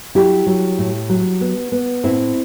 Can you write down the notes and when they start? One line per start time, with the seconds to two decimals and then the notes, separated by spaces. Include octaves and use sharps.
0.15 F#3 E4 G4
0.46 F#3
0.78 A2
1.09 F#3
1.41 B3
1.72 B3
2.04 A2 C4 E4